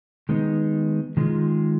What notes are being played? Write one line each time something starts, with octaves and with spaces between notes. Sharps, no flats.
D#3 G#3 B3 D#4
D#3 G#3 B3 F4 G#4